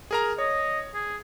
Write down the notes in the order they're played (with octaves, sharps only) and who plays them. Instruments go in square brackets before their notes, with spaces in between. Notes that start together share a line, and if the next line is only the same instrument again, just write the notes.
[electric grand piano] G#4 A#4 A#5
[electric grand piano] C#5 [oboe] D#5
[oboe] G#4